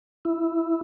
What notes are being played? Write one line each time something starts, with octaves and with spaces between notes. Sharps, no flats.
E4